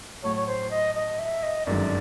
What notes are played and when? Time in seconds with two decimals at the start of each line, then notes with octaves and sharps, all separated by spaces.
0.23 A2 F#3 A3 C#5
0.36 C#5
0.47 C5
0.70 D#5
0.95 D#5
1.19 E5
1.43 D#5
1.66 G1 F#2 D#3 G#3 D5